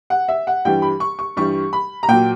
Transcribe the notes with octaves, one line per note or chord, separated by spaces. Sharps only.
F#5
E5
F#5
G2 E3 G3 G5
B5
C#6
C#6
G2 E3 G3 C#6
B5
A#5
A#2 F#3 G5